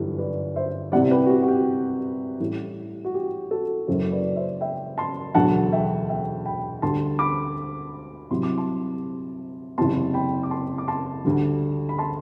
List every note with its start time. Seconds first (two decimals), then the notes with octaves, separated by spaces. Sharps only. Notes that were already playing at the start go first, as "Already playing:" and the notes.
Already playing: G1 F#2 E3 G3 A4 B4
0.18 B4 D5
0.56 C5 E5
0.92 C2 C3 G3 D5 F#5
1.11 G4 B4
1.25 F#4
1.30 G4
1.42 F#4
1.48 G4
2.40 A1 A2 G3
3.05 F#4
3.14 G4
3.51 F#4 A4
3.87 F#1 F#2 F#3 A4 C5
4.12 B4 D5
4.36 C5 E5
4.61 E5 G5
4.98 A5 C6
5.35 E1 D2 D3 F#3 F#5 A5
5.72 E5 G5
6.09 E5 G5
6.45 G5 B5
6.82 D2 D3 G3 A5 C6
7.19 B5 D6
8.31 C2 C3 F#3 C6
8.43 D6
8.58 A5 C6
9.78 F#1 E2 C3 A5 C6
10.14 G5 B5
10.43 D6
10.51 A5 C6
10.78 D6
10.88 A5 C6
11.25 D2 D3 G3
11.89 B5
11.98 A5 C6